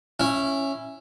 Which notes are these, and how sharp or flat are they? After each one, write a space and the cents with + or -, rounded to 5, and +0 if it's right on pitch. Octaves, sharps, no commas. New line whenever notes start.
C#4 -10 E4 +5